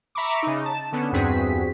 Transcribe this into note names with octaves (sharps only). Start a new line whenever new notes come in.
E5 A#5 B5 C#6 D6
C#3 D#4
A5 E7
D3 B3 C#4
E2 G2 C4 F#4 G#4 B6